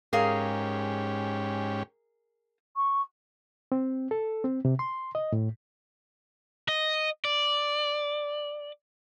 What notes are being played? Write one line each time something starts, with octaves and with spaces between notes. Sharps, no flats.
G#2 C#4 G4 G#4 A#4 F5
C#6
C4
A4
C4
C3
C6
D#5
A2
D#5
D5